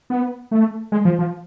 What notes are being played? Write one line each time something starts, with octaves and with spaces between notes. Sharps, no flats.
B3
A3
G#3
F3
F3